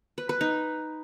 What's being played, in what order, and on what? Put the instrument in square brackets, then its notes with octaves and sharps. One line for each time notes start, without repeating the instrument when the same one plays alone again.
[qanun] B4
B4
D#4